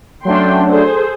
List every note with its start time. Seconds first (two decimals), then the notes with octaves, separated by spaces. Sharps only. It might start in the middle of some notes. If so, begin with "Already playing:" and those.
0.25 F#3 A3 C#4 D4 G5 C6
0.70 G#4 A4 C5